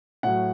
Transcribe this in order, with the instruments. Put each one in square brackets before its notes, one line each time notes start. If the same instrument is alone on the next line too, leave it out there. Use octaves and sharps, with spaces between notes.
[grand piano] A2 F#3 F#5